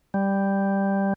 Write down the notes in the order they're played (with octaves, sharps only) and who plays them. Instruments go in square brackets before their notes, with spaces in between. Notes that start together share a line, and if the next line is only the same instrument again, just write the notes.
[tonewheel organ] G3